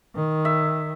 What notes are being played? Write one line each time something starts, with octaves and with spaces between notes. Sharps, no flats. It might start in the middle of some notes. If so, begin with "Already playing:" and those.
D#3
E5